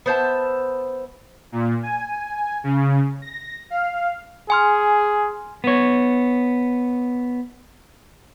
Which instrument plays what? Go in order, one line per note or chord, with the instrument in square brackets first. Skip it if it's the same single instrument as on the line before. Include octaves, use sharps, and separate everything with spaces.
[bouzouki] B3 C5 E5 A5
[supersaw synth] A#2
G#5
C#3
A#6
F5
[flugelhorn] G#4 [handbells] G#5 C6 F6
[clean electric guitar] B3 C#5